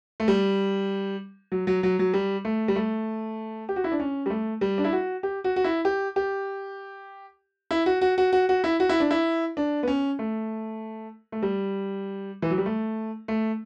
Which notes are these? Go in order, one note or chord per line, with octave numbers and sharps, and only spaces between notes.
A3
G3
F#3
F#3
F#3
F#3
G3
A3
G3
A3
G4
F#4
E4
D4
C#4
G3
A3
G3
D4
E4
F#4
G4
F#4
F#4
E4
G4
G4
E4
F#4
F#4
F#4
F#4
F#4
E4
F#4
E4
D4
E4
D4
B3
C#4
A3
A3
G3
E3
F#3
G3
A3
A3